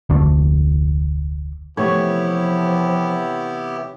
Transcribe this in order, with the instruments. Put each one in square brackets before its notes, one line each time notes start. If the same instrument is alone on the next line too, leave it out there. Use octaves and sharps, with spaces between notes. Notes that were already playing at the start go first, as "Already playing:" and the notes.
[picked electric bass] F1 D2 D3 A3
[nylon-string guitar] C3 E3 A3 [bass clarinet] F3 [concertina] B3 E4 G4 [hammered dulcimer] C#5